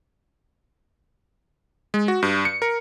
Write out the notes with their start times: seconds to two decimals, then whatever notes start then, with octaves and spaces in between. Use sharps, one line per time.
1.94 G#3
2.08 F#4
2.23 G2
2.45 C#7
2.62 A#4